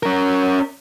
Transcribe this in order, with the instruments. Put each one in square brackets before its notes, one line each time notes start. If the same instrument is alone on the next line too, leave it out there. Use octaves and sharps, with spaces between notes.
[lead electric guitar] C#4 A#4